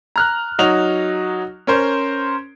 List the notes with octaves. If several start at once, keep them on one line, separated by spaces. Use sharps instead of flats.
A#5 F6 F#6
F#3 D#4 F#4 F7
C#4 A#4 C5